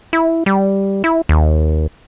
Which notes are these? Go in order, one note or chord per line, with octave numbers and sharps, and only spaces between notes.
E4
G3
E4
D#2